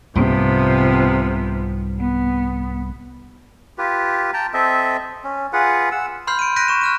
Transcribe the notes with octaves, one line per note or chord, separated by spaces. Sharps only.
C2 G#2 C3 F3 B3
B3
F4 G4 B4
G5 A5 A#5
C4 A4 D#5 E5
C#4
F4 G#4 B4 F#5
F#5 E6
B5 C6 F6 G6 C7
D7 D#7
F#6 G6 A#6 B6 D7 D#7
C#6 E7
F6 F#6 D#7